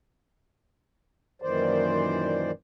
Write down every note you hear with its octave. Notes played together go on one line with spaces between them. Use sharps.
F#2 A#2 D#3 E3 C5 D5